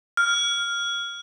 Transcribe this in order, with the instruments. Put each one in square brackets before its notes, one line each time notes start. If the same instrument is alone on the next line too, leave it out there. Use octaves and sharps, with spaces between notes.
[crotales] F6